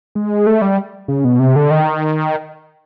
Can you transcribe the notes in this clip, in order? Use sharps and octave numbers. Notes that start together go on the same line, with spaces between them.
G#3
A3
G3
C#3
B2
C3
D3
D#3